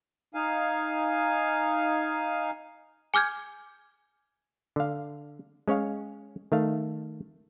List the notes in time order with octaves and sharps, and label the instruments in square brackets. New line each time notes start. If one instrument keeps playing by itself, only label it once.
[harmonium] D#4 F5 G#5
[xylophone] G#5 D6 F6 G6 G#6
[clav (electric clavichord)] D3 F5
G#3 C#4 C#5 F5
D#3 A3 F5